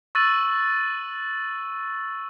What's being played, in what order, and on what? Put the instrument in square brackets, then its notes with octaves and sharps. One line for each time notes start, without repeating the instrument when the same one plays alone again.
[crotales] C#6 E6 F#6 A6 D#7 F#7